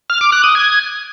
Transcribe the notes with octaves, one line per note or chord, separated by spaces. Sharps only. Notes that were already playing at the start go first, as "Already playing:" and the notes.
F6
D6
F#6
D#6
G#6